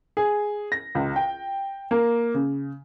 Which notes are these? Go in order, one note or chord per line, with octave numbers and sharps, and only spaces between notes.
G#4
A#6
C#2
G5
A#3
C#3